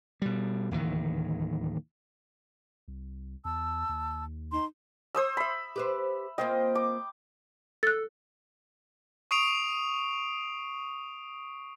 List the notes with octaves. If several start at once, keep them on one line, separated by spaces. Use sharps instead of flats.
B2 G3
D1 D#2 D#3 E3
C2
E2 A5 E6
D#2
D#4 C6
C5 D#6 E6
E5 B5
G4 B4 C5
A#3 C4 F4 D#5 G5
D6
A4 F#6 A6
C#6 D#6 C7 D7 F7